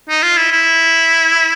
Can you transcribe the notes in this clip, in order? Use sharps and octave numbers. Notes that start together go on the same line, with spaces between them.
D#4
F4
E4
E4